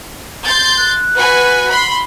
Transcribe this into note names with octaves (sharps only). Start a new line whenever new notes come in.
C6 G6 A6
F#6
F#4 B4 G#5
B5 C6